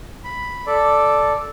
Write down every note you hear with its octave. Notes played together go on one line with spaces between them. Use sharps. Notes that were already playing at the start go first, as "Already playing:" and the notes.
B5
A4 D5